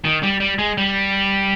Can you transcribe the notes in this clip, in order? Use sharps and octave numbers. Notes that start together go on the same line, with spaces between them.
D#3
G3
G3
G#3
G3